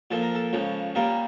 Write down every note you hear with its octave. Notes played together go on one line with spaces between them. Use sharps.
A#2 F3 A#3 A4
A#4
A4
C#2 C#3 F3
A#2 G3 A#3 A#4